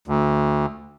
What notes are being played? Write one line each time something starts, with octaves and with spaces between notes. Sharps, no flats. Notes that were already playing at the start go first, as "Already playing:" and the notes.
D2